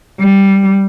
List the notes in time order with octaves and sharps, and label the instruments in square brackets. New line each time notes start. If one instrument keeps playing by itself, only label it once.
[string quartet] G3